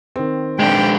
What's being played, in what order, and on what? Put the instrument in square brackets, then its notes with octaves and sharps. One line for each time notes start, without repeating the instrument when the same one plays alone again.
[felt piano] D#3 C4
[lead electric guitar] G#3 D4 [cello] G5